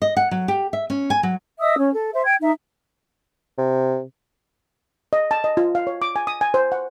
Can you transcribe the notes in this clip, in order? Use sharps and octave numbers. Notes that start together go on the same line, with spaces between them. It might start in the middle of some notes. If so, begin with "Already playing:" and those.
D#5
F#5
F#3
G4
E5
C#4
G#5
F#3
D#5 E5 D#6 E6
C#4 C#5
A4
C5 E5
G5 G#6
D#4 E5
C3
D#5
A5
D#5
F4
F5
C#5
D6
G#5
D#6
G#5
C5
F#5